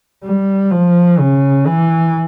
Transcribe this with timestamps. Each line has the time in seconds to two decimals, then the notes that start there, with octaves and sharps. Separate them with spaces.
0.25 G3
0.71 F3
1.19 C#3
1.66 E3